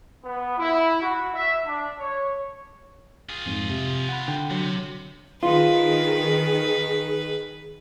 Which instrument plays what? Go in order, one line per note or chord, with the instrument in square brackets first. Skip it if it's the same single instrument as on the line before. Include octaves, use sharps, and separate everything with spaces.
[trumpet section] B3
E4
F#4
E5
D4
C#5
[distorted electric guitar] F4 G#4
[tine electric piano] F2 G#2
C3
F#5 B5
[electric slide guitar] D3 [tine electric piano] G5
[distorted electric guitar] C3 [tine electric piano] F#3
[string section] D#3 [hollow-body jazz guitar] F4 [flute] G#4 [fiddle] B4